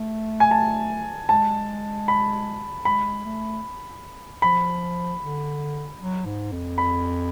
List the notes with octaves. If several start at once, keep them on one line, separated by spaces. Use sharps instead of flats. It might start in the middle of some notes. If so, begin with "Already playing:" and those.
Already playing: A3
G#5
A5
G#3 A5
B5
G#3 B5
A3
F3 B5
D3
F#3
G#2
F2
B5